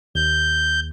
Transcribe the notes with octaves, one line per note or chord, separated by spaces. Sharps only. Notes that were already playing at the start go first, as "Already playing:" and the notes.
D#2 G6